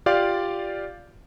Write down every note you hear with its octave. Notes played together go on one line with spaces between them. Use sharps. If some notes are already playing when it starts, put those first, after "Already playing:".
F4 G4 D5 F5